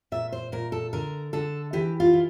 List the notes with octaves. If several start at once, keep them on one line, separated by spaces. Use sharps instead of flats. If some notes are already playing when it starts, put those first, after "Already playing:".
A#2 E5
C5
A#2 A#4
A4
D3 A#4
D3 A4
E3 G4
F4
E3